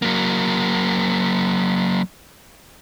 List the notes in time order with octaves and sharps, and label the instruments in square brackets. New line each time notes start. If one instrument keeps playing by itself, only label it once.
[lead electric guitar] F#3 A#3